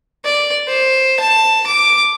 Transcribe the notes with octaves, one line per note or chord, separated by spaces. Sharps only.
D5
C5
A5
D6